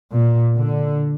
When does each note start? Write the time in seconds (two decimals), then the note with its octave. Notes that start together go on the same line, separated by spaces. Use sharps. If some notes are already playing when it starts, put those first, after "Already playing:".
0.13 A#2
0.57 D3